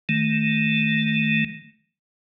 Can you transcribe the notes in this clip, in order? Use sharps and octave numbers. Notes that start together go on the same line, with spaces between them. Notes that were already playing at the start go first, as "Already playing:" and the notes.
D#3 A3